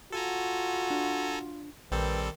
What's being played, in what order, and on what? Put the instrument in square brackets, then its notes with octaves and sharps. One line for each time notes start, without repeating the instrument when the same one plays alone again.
[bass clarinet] F4 [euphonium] F#4 [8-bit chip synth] A4 G#5 A#5
[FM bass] D4
[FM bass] A#1 [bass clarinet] D#3 [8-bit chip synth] G3 C4 A4 [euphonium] B4